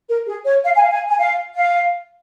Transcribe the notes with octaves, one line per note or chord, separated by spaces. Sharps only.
A#4
G#4
C#5
F5
G#5
F5
G#5
G#5
F5
F5